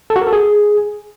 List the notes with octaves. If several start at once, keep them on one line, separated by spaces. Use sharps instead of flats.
A4
F#4
A#4
A4
G#4